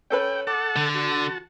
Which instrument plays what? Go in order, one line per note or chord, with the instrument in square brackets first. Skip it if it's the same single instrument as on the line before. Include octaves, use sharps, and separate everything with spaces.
[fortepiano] C#4 A4 B4 [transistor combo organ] G5
[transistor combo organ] A4 F#5 A5 [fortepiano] D6
[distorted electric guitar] D3
[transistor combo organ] F#4 A5